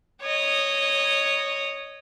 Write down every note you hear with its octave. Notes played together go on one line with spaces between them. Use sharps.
C#5 D#5